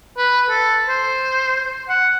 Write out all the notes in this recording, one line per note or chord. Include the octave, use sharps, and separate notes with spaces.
B4
A4
C5
F#5